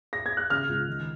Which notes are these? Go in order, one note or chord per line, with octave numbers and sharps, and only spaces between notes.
A#6
G#6
F#6
C#3 F6
C#2
D#3